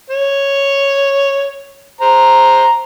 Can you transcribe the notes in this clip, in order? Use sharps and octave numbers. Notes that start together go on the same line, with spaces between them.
C#5
C5 A#5